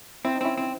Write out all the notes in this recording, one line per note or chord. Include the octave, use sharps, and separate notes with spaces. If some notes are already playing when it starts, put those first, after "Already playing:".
C4 E4
D#4
C4 C#4 E4
C4